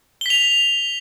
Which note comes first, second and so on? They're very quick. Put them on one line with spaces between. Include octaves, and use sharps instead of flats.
G7 B6 F7